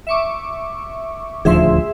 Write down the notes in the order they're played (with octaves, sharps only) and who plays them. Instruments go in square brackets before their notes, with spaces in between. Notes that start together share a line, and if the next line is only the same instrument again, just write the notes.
[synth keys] E5 C#6 D6
[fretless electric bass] D#1 D2 F3 [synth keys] G#4 E5 C6